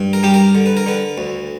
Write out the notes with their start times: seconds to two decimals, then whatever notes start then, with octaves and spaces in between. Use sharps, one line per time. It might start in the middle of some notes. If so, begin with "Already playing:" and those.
Already playing: G2
0.13 A#4
0.23 G3 G4
0.34 A#4
0.55 D3
0.66 B4
0.77 A#4
0.86 D3 B4
1.18 D2